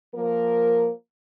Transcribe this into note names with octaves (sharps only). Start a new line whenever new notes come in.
F3 A#3 A#4